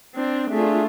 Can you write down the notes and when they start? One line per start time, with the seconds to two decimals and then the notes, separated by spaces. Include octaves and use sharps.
0.15 C4 D4
0.50 A3 D4 F4 G#4 E5